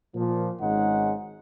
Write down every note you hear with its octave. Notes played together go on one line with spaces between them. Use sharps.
A#2 F3
G#1 G#3 C#4 D#4 F#5